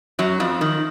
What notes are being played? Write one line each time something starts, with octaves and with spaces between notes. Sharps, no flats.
F#2 F#3
F2 F3
D#3